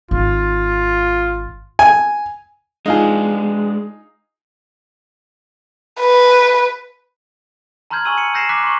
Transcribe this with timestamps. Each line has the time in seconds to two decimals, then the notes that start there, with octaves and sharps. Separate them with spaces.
0.11 G#1 F4
1.79 G#5
2.86 G#3 D4 D#4 F4 G#4
6.01 B4
7.90 A5 A#5 C6 F6 G6 G#6
8.05 G#5 C#6 E6 D#7 F#7
8.17 C#7 D#7
8.34 E6 G6 A#6 C7 E7
8.49 A#5 D6 F#6 B6
8.64 C6 C#6